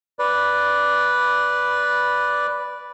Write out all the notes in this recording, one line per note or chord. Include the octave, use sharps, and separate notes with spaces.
B4 D5